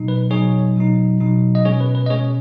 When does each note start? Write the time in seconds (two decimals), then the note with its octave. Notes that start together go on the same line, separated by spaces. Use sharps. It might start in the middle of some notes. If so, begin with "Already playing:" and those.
Already playing: B2 F#3 D#4
0.08 B4
0.30 B2 F#3 D#4 G#4 C#5
0.76 B2 F#3 D#4
1.21 B2 F#3 D#4
1.55 D#5
1.65 B2 G#3 C#4 G#4 C#5
1.80 B4
1.95 B4
2.06 D#5
2.10 B2 G#3 C#4 G#4 C#5